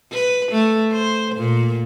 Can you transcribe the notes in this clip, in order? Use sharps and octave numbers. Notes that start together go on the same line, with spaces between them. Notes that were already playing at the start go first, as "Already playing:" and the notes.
B4
A3
C5
A#2